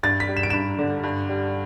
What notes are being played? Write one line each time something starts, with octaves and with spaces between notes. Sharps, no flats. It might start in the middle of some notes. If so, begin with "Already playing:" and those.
G2 A6
B6
G3
E7
D7
G2 E7
D3
G2
G3